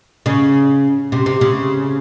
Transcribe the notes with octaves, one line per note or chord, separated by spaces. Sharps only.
C#3
C3
C3
C#3